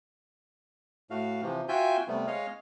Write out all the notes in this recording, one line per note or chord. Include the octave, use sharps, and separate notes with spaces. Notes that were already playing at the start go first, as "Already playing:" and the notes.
A2 A3 F#4 F5
C3 E3 F3
F4 F#4 E5 G5 G#5 G6
C3 G3 A3 B3
G#3 C#5 D#5 F5